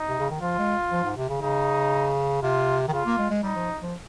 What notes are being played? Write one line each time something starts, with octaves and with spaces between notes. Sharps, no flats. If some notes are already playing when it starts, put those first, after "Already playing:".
Already playing: D#4
C3
C#3
D#3
F3 F4
G#3
F3
G#2
C3
C#3
C#3 D#4
C3 F4
D#3
C#3 F4
A#3
G#3
G#3
G3 D#4
F3
F3